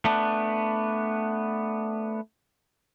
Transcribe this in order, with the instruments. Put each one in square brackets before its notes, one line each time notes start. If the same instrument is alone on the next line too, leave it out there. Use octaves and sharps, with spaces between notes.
[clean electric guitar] A3 B3 D4